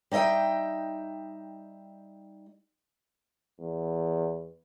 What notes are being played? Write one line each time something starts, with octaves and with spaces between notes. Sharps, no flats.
G3 D#4 D#5 E5 G5
E2